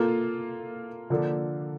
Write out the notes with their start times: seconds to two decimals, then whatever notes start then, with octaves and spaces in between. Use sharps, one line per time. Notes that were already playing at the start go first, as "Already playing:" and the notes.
Already playing: A#3 F4 A4
1.10 D3 F3 A#3 D4 A4